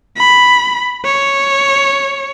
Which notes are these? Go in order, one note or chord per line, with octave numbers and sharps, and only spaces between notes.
B5
C#5